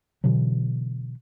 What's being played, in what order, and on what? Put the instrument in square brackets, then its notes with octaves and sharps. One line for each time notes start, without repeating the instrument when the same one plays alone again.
[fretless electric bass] B2 D3 E3 F#3